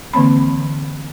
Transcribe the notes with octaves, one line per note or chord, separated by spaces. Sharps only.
D3 E3 A#3 C4 B5